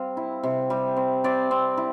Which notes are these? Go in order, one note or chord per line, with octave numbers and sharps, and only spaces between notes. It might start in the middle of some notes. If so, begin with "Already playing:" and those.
Already playing: G3 C4 F5
E4
C3
G3
C4
C4 D5
C4
E4